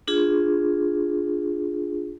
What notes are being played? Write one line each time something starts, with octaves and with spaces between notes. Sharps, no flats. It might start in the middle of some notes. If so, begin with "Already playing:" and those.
D4 F4 G#4